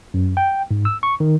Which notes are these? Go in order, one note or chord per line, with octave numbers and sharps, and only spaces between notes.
F#2
G5
G#2
E6
C#6
D#3